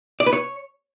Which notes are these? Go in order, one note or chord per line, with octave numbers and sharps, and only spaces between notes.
D5
B4
C#5